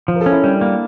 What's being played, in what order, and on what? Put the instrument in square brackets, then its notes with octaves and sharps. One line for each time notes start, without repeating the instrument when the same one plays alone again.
[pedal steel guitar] F3
[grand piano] A#4
A4
[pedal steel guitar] C#4
[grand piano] E4
[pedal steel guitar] G3 [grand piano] D4
[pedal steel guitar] A#3